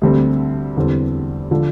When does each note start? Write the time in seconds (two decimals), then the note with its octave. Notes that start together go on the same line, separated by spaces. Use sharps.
0.01 D2 D3 G3 C4
0.76 E2 D3 G3 C4
1.51 D3 F3